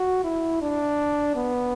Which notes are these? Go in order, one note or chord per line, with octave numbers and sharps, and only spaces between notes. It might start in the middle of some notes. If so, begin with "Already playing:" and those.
Already playing: F#4
E4
D4
B3